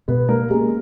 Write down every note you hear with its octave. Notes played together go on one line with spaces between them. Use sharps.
B2 B3 B4
A#3 A#4
G#3 A#3 C#4 G#4